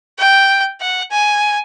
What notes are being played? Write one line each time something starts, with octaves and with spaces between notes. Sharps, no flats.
G5
F#5
G#5